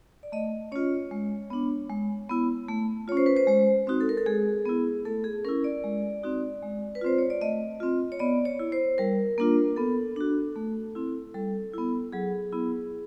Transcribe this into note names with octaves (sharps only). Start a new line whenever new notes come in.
D5
A3 D#5
C#4 F4 C#5
G#3
B3 D4
G#3
B3 E4
A3
C#4 F4 C#5
C5
B4
C5
G#3 C5
C4 D#4 F#4
A4
A#4
A4
G#3 G#4
B3 E4
A3 A4
G#4
C#4 E4 A#4
D5
G#3
C4 D#4 F#4
G#3
B4
C4 F4 C5
C#5
D5
A3 D#5
C4 F4
C#5
B3 D5
C#5
E4
C5
G3 A#4
A#3 D4 F4
B3 A4
D4 F#4
A3
C4 E4
G3 A4
B3 E4
F#3 G#4
B3 E4